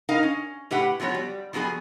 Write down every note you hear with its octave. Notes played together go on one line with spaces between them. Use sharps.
D#4 A#4 F5
C#4
A2 G4 B4 F#5
F3 F#3 B3 F#4 C#5
G3
F3 F#3 B3 G#4 G#5